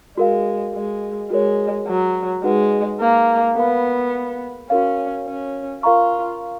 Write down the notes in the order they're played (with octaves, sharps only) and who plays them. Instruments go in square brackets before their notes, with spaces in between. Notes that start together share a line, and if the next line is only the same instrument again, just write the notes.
[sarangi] G#3 [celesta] F#4 A#4 F5
[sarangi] G#3
[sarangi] G#3 [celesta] F#4 A#4 C#5
[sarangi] F#3
[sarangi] G#3 [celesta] D#4 F#4 B4 F#5
[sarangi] A#3
[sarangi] B3 [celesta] A#4 F5 B5
[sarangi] C#4 [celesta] F#4 A#4 F5
[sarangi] C#4
[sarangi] F4 [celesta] A#4 F5 A#5 C#6